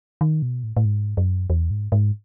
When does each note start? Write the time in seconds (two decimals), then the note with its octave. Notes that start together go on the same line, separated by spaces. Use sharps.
0.21 D#3
0.42 B2
0.64 A2
0.77 A2
0.85 G#2
1.17 F#2
1.50 E2
1.71 G#2
1.92 G#2